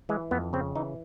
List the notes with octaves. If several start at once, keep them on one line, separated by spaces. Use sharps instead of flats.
E3 G#3
F2 B3
C#3 C4
E3 D#4